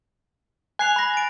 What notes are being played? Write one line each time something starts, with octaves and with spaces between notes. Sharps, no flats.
G#5 F#6 C7 F7
B5 A#6
A6 D7